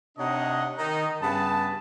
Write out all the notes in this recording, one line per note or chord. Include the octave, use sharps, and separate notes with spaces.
C3 D4 D#4 C#5 D#5 F#5
D#3 D#4
G2 C#3 B3 A5